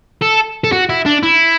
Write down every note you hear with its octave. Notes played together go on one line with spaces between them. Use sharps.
A4
A4
F#4
E4
D4
E4